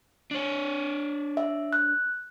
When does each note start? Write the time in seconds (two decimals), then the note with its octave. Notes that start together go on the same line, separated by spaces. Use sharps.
0.31 D4 C#5
1.37 E5
1.73 F#6